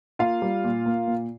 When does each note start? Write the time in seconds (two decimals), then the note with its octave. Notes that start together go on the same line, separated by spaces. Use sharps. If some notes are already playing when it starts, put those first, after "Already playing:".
0.19 A#3 F4 F5
0.42 G3
0.64 A#2
0.86 A#3
1.07 A#2